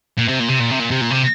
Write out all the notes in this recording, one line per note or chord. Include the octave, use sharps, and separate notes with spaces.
A#2
C3
A#2
C3
A#2
C3
A#2
C3
A#2
C3